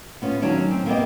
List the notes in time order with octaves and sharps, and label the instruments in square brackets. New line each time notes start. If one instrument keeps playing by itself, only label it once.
[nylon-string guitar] B3 C#4 F4
D#3 F#3 C#4 D4
C4
A#3 B3 G4 D#5